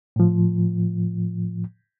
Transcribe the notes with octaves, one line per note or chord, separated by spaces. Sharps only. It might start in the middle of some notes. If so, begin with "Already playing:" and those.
A2 F3